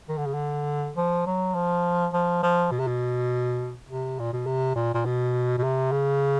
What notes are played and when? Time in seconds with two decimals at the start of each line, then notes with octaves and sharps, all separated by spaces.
0.09 D#3
0.18 D3
0.26 C#3
0.34 D3
0.96 F3
1.27 F#3
1.55 F3
2.13 F3
2.43 F3
2.71 B2
2.79 C3
2.87 B2
3.89 C3
4.19 A#2
4.33 B2
4.46 C3
4.76 A#2
4.94 A#2
5.06 B2
5.58 B2
5.63 C3
5.92 C#3